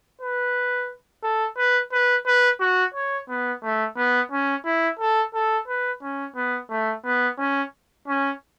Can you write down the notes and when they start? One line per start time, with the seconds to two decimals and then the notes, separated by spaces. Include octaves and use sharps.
0.21 B4
1.23 A4
1.57 B4
1.92 B4
2.26 B4
2.61 F#4
2.94 C#5
3.29 B3
3.63 A3
3.97 B3
4.32 C#4
4.65 E4
4.99 A4
5.34 A4
5.68 B4
6.03 C#4
6.36 B3
6.70 A3
7.05 B3
7.38 C#4
8.08 C#4